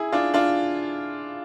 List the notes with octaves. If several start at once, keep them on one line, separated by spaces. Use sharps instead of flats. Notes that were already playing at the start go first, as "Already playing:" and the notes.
Already playing: E4 G#4
D4 F4
D4 F4